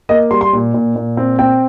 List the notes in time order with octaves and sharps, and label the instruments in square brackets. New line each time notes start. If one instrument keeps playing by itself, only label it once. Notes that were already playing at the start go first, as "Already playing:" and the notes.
[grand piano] A#3 D#5
G3 C6
C6
A#2
A#2
A#2
C4
C4 G5